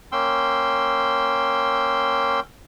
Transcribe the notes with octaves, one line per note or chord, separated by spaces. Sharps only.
A#3 C#4 G5 C6 E6